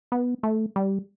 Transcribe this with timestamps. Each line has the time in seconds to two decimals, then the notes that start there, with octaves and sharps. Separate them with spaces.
0.12 B3
0.43 A3
0.76 G3